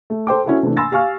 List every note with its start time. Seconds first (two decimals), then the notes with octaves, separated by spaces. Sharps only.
0.10 A3
0.27 A4 C5 G5 D6
0.45 C#4 E4 F#4 A4
0.63 C3 E3 A3 D4
0.77 G#5 B5 C6 E6 A6 A#6
0.91 G4 F5 G#5 C#6 F6